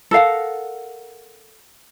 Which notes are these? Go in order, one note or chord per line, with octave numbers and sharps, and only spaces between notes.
A4 A#4 F5 F#5